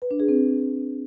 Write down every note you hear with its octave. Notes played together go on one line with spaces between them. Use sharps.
B4
D4
G#4
C4